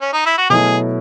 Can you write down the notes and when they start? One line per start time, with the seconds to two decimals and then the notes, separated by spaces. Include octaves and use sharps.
0.01 C#4
0.13 D#4
0.26 E4
0.38 F#4
0.50 B2 F#3 A3 E4 G#4